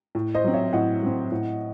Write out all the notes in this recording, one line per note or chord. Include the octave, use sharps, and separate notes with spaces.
A2
C5 D#5
F#3 C4
C#5 E5
A2 D#5 F#5
F#3 C4
A2